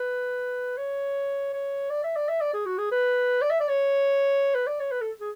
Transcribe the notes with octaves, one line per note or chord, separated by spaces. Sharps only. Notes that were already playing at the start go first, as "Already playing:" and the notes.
Already playing: B4
C#5
C#5
D5
E5
D5
E5
D5
G#4
F#4
G#4
B4
D5
E5
D5
C#5
B4
D5
C#5
B4
A4
G#4